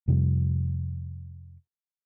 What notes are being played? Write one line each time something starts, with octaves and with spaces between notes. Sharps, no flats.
F2 C3 F3 G3